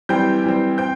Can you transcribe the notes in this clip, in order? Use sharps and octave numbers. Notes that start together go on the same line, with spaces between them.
E3 G3 C4 G5 G6
E3 G3 C4
C4 G5 G6